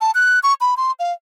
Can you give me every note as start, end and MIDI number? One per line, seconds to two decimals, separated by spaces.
0.01 0.11 81
0.15 0.39 90
0.43 0.54 85
0.61 0.74 83
0.77 0.92 84
0.99 1.13 77